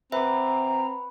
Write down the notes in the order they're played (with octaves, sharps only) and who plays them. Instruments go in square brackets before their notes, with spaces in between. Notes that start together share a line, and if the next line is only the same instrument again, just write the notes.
[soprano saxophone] C4 [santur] B4 F#5 D6 [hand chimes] E5 [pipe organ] A#5